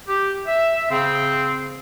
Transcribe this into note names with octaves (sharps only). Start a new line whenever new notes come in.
G4
E5
C#3 C4